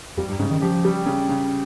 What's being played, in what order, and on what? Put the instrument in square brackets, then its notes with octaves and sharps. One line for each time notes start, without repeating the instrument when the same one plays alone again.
[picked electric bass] F2 [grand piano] G3
[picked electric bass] G2
[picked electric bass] G#2 [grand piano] C#3
[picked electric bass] D#3
[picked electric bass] F3 [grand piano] G4
[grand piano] G3
C#3
C#3